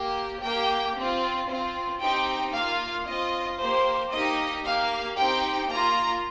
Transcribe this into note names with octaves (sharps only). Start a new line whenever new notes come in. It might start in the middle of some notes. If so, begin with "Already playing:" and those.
Already playing: A#3 G4
A#3 G4 G5
C4 F4
C4 F4
C4 D#4 G4 G5
A#3 F4 F5
C4 F4 D#5
A#3 G4 C5
A#3 D#4 G4 D#5
A#3 G4 F5
C4 D#4 G4 G5
A#3 F4 A#5